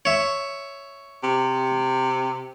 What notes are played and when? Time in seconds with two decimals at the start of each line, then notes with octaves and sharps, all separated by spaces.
0.05 C#5 E5
1.24 C3